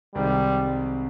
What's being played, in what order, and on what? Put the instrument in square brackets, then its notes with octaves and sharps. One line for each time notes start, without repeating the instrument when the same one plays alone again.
[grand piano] C2 C3 D#3 G#3 C4 [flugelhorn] G3